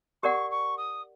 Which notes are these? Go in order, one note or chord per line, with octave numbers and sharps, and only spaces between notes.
G4 A#4 D5 F#5 C#6
C#6
D#6